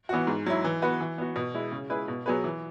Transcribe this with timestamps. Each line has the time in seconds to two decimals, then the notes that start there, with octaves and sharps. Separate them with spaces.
0.09 E3 B3 F#4
0.27 G#2
0.46 F#3 E4
0.64 E3
0.82 B3 F#4 B4
1.01 E3
1.18 B3 F#4
1.36 B2
1.54 G#3 E4
1.72 C#3
1.90 G#3 E4 G#4 B4
2.08 B2
2.26 F#3 B3 G#4 B4
2.44 E3